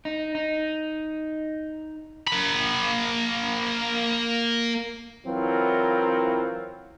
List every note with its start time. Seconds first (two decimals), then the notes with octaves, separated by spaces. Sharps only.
0.05 D#4
0.35 D#4
2.28 A#3 B5
5.26 E3 F#3 C4 E4 F4 A#4